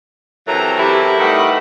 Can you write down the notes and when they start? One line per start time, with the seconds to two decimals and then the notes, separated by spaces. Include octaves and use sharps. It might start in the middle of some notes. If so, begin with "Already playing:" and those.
0.48 C3 E3 F#3 A4 A#4 A#5
0.79 E4 G4
1.19 D#3 G3 A3 B4 F#5